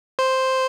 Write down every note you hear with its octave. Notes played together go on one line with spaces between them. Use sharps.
C5